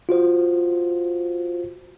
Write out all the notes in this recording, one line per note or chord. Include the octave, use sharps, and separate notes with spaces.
F4 F#4 C5